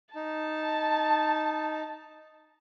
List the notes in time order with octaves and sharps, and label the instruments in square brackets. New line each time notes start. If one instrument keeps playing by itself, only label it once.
[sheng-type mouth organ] D#4 [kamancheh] A5